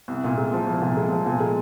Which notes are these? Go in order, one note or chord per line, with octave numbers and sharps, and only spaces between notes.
C2
A#2
G#3
F3
C2
A#2
G#3
F3
A#2
G#3